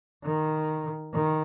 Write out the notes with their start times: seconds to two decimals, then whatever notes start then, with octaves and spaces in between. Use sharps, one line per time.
0.24 D#3
1.13 D#3